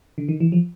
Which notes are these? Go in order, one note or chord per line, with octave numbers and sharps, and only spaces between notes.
D3
D#3
E3
F3